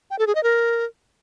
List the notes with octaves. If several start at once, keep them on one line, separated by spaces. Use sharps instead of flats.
G5
A4
G#4
D#5
A#4